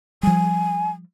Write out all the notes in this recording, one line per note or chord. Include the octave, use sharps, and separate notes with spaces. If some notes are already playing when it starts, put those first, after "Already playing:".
F3 G3 G#5